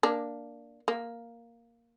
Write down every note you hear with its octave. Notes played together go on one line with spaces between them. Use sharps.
A#3 D4
A#3